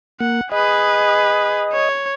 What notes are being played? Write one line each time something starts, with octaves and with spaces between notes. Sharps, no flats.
A#3 F#5
G#4 B4 D#5
C#5